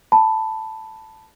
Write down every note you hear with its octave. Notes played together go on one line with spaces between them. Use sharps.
A5 B5